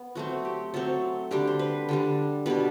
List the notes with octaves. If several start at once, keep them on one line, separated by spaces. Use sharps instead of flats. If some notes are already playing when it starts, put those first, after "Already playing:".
Already playing: B3
F#3 A3 C4 F#4
G4
F#3 A3 C4 A4
D3 G3 D4 G4
C5
B4
D3 G3 D4
B2 G3 D4 B4